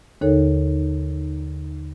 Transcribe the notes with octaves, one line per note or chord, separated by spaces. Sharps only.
D#2 D3 D#4 A4 A#4 C#5